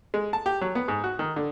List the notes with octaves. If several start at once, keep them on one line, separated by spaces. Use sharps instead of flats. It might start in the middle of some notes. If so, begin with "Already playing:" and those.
G#3
A5
G4
F#3
B3
G#2
F#4
D#3
D3